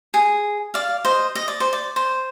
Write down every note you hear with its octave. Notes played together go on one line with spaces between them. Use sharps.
G#4
D5 F5
C5 D#5
D#5
D5
C5
D5
C5